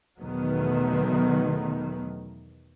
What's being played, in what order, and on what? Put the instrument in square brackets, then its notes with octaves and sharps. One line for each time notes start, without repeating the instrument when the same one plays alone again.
[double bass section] E2 B2 D#3 F#3 A3 B3